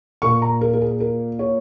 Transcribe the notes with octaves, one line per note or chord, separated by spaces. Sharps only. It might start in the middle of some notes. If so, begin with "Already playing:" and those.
A#2 A#3 C#6
A#5
A#4
A#4
G#4
A#4
C#5